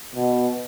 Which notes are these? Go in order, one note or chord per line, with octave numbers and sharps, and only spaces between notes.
B2